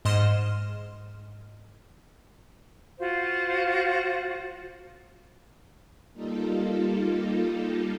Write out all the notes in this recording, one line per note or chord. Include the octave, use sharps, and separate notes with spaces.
G#2 D#5 C6 F6 E7
F4 F#4 C5 F5
G3 A#3 D#4 F4 A4